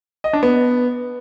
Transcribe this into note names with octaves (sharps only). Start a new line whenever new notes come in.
D#5
D4
B3